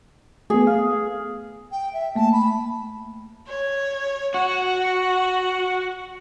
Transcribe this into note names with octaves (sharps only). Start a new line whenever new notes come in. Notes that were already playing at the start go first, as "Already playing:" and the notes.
A3 B3 G#4
F5
G5
E5
A3 A#3 A5
B5
C#5
F#4 F#5